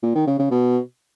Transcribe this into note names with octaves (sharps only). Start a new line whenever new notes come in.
A#2
D#3
C#3
C#3
B2